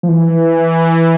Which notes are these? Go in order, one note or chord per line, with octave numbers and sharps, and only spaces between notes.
F3
E3